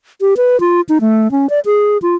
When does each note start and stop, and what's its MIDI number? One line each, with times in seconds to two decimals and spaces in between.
0.21 0.34 67
0.37 0.60 71
0.60 0.81 65
0.89 0.98 63
1.01 1.31 57
1.31 1.49 61
1.50 1.60 74
1.66 1.98 68
2.02 2.15 65